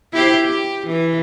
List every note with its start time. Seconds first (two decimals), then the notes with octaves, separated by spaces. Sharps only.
0.13 E4 G4 C5
0.44 G4
0.87 E3